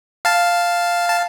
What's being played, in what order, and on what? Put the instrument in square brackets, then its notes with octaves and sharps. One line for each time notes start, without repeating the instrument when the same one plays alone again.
[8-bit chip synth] F5 A5
A5